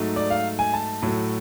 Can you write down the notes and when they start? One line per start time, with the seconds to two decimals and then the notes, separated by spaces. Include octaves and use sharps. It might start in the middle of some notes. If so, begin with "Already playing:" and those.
Already playing: G#2 F#3 A3
0.16 D5
0.30 F5
0.59 G#5
0.74 A5
1.02 A2 F#3 A3